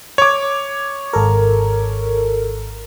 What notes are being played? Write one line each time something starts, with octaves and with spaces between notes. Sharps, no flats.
C#5 D6
G#1 A4 A#4